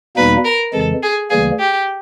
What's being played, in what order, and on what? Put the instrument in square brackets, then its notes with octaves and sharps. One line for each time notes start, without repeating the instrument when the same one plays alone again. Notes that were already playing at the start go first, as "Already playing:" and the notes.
[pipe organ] E2 B2 G3 A#3 D#4 [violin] B4
[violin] A#4
[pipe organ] F2 C#3 E3 G#3 [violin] A4
[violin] G#4
[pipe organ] D2 C#3 E3 G3 A#3 [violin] G#4
[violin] G4